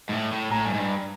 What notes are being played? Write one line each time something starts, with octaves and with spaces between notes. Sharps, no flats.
G#2
A2
A2
A2 G#5 A#5
G2
G#2
G2